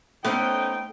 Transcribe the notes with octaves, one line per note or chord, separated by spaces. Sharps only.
A3 B3 C#4 D#4 C5 G5